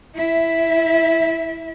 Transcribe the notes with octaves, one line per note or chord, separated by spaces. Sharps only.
E4 E5